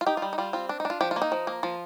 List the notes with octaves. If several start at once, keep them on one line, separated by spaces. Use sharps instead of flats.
F4
D#4 G4
F4
G3
D#4
G3 F4
C4 F4
D4
D#4
D4 F4
F3 G4
F4
A#3
D#4
F3
A#3
F3 F4